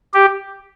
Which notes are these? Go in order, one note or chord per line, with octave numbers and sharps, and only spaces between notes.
G4